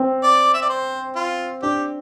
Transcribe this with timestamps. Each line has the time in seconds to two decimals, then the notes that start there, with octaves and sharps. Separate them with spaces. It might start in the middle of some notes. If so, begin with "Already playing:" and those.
Already playing: C4
0.23 D5
0.54 E5
0.62 D5
0.70 C5
1.16 F4
1.63 D4 G4